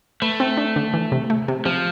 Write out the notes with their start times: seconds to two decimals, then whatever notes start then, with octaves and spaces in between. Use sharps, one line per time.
0.22 A3 B4
0.40 C4
0.57 D4
0.76 D3
0.94 E3
1.12 C3
1.30 A3
1.48 C3
1.65 C3 F3